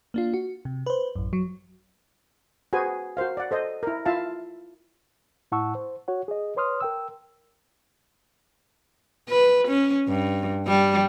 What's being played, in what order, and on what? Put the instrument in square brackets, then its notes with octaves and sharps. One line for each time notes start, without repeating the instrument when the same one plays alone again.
[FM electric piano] A#3 D4 F4
F#4
C3
B4 C5
A1 F#2
F#3
[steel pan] F#4 G#4 B4 C5 G#5
F#4 A#4 C5 F5
D5 F#5
A4 C5 D#5
E4 A#4
E4 F4 E5 F5 A5
[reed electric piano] A2 E4 F#5 A5 C#6 E6
C5
F#4 C#5 F#5
G#4 D#5
B4 C#5 C6 D#6 F6
A#4 G5 E6
[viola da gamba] B4
C#4
G2
G3